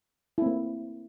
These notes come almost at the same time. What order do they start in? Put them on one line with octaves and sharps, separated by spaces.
E4 C4 A#3